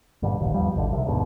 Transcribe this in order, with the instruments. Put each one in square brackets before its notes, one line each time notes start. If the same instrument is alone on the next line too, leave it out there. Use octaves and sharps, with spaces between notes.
[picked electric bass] G2 A#2 D3 G3
D1 A1 D#2
E2 F3 G3
G#1 B2 D3
C2 C3 D#3
D#2 G#2 B2 D3